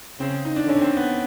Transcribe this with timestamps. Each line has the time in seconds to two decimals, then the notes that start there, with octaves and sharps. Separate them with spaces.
0.20 C#3 C4
0.45 D#4
0.56 D4
0.66 D3 C#4
0.81 C4
0.97 B3